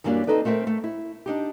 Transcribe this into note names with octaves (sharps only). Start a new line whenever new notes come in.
F#2 E3 G3 A#3 D4 D5
C4 C#4 D#4 A4 B4 D5
A3 C4 A#4 E5
A3
E4
D4 D#4 G4